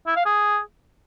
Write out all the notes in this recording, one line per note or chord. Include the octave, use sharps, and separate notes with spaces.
E4
F5
G#4